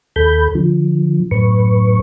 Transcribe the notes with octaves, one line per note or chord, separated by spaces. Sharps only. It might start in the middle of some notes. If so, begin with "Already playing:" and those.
D#2 A4 B5 G6
D3 F3
F#2 A2 B4 C#6